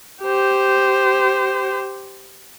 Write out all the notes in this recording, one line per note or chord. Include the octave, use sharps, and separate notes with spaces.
G4 C5